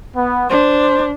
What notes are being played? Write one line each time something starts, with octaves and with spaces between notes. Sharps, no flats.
B3
D4 C5